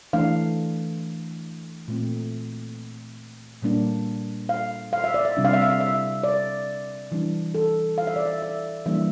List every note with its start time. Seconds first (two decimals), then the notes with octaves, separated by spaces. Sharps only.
0.13 E3 A3 D4 F5
1.88 A#2 A3 C4
3.62 A#2 G3 A#3 D4
4.49 F5
4.93 F5
5.04 E5
5.14 D5
5.25 E5
5.37 C3 G3 D4
5.45 F5
5.53 E5
5.61 F5
5.81 E5
6.24 D5
7.12 E3 G3 D4
7.54 A4
7.98 F5
8.07 E5
8.16 D5
8.25 E5
8.42 E5
8.86 E3 G3 A#3 D4 E5